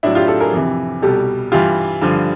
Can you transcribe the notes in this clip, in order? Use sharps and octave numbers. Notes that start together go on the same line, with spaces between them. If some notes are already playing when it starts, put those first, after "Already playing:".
A2 F#3 D4 E4
F4 G4
G4 A4
G#4 A#4
F2 C3 E3
C2 B2 G3 G4 A4
G2 E3 G3 F4 G4
G2 D3 F3